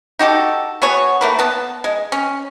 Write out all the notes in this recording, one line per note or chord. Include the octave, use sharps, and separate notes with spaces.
D#4 F#4 G4 A4
B3 F#4 G#4 C#5
A3 A#3 B4
B3 A5
G#3
C#4